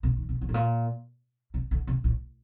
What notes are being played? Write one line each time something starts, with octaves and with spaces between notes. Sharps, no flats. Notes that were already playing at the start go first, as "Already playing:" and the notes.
C3
D#3
C3
C3
A2
A#2
C3
D3
C3
A2